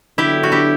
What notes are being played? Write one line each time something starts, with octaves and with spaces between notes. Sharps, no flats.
D3 F#3 B3 D4 E4 G4 A4
F#4
E4 G4